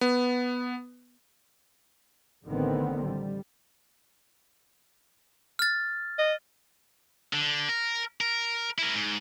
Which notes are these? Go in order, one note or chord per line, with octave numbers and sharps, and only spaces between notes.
B3
A1 D3 D#3 B3 C4
G3
F6 A6
D#5
D3
A#4
A#4
E4 A#4
G#2